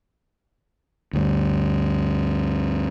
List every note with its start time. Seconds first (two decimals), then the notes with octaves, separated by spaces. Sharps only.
1.13 D2 G2